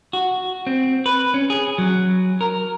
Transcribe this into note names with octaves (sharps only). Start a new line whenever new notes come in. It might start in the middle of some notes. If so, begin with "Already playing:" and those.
F#4
C4
B4
C#4
G#4
F#3
A#4